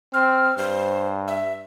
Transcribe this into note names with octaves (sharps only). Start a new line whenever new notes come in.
C4 F6
G2 C5
E5